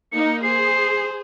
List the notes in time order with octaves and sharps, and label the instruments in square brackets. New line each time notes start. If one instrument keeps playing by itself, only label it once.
[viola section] A#3 D#4 [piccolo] C#7
[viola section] G#4 [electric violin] C5 [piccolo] C7